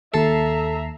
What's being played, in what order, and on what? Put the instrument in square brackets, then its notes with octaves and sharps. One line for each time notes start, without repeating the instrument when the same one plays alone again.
[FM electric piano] D#2 A5 C7 [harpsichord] A4 [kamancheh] E5 A#5